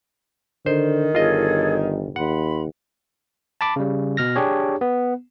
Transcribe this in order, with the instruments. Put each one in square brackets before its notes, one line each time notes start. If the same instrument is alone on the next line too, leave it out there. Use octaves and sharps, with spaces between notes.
[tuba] D3 [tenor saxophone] D#3 [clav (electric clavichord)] C5
[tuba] G1 [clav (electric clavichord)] F4 D#5 [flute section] G#4 A4 C#5
[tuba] D#2 [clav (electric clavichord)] F#5 [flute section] B5 C6
[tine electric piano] A5 B5 D6
C#3 G3
B2 F6 A#6
D4 G4 G#4 C#5
B3